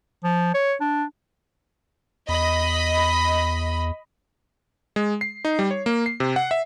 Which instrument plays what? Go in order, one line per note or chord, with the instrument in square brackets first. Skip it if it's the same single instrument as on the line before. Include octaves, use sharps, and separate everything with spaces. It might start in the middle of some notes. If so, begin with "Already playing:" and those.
[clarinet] F3
C#5
D4
[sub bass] E2 [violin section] D#5 B5
[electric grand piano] G#3
C7
D#4
G3
C#5
A#3
C7
C3
F#5
E5